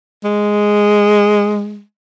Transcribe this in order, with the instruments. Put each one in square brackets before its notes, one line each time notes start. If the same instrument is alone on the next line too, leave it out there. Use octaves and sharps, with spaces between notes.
[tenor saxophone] G#3